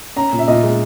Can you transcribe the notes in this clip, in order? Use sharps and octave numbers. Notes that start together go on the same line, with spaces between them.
C#4 A#5
A#2
E5
A#2 D#5
G#3